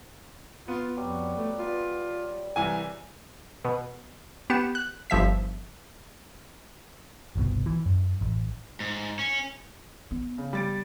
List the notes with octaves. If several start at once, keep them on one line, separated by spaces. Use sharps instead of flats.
B3 F4
F2 F#3 G3
A3
F4 B4 D5
C2 E3 G#5
B2
B3 G4 C#7 E7
F#6
G1 F3 E5 B6
G1 C2 B2
E3
F#2
A1
G#2
C#4
B3
C#3
G3 A6 D7